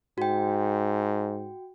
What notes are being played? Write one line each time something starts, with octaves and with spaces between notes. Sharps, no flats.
G#2 F#4 G5